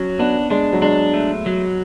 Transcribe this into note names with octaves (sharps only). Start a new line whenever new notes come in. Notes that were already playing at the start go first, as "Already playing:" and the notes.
Already playing: F#3 C#4
B3 D4
G#3 D4
F#3
G#3 D4
A3
F#3